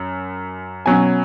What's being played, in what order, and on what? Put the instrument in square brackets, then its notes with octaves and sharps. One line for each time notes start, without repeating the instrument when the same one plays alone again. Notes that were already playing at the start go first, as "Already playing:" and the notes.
Already playing: [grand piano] F#2
B2 F#3 C#4 G#5